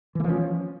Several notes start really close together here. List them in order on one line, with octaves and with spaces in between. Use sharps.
E3 A3 F3 C#4